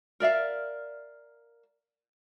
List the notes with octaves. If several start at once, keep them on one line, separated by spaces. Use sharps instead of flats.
A#4 D5 E5 F5